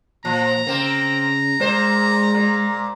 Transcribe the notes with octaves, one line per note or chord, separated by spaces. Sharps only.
A#2 F3 A#5
C#3 A#3 C4
A#2 G#3 C5
A#2